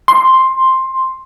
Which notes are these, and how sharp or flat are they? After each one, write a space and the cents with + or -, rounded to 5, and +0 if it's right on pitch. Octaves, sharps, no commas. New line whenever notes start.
C6 +5